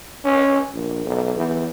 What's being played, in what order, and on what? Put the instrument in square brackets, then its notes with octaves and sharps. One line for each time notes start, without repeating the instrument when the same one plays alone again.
[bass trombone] C#4
A#1
B1
E2